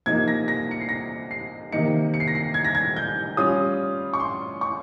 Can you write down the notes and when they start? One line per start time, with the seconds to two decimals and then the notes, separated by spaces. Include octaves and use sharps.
0.06 C3 F3 A#3 D#4 G#6
0.28 A#6
0.48 A#6
0.71 C#7
0.81 C7
0.89 A#6
1.31 C7
1.72 C3 D#3 A#3 D#4 C#7
2.14 C#7
2.20 C7
2.28 A#6
2.35 C7
2.54 G#6
2.65 A#6
2.75 G#6
2.96 G6
3.37 G3 C#4 F4 D#6
4.14 C#6
4.20 C6
4.61 C#6